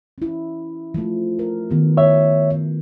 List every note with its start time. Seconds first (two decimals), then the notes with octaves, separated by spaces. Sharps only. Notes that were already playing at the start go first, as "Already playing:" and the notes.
0.18 C#4 E4
0.94 F3 A3
1.39 A#4
1.70 D#3 B3 G4
1.97 C#5 E5